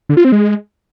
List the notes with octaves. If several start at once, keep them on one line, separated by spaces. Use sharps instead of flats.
D3
F4
C4
G#3